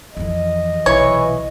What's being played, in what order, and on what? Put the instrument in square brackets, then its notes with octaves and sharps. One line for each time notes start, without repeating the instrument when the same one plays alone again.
[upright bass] F2 E3 [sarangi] D#5
[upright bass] B1 C3 [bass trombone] E3 [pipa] C#5